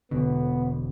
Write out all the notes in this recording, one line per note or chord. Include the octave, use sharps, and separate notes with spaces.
E1 B2 D3 B3